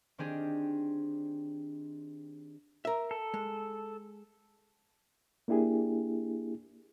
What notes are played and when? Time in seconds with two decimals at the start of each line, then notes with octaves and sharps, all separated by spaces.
0.18 D#3 C4 D4 G4 G#4
2.85 A#4 E5
3.11 A4
3.34 G#3
5.48 A#3 D4 E4 G4 G#4